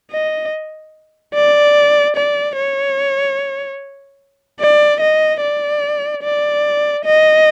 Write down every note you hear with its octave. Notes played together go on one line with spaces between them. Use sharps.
D#5
D5
D5
C#5
D5
D#5
D5
D5
D#5